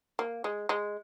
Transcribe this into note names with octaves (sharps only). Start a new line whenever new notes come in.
A#3
G#3
G#3